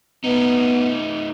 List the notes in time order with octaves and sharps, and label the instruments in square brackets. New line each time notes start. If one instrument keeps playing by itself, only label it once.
[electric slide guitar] A3 D#4 [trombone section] B3